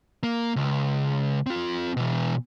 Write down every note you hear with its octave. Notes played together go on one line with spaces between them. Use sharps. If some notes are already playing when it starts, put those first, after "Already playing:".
A#3
C#2
C4 F4
B2 E3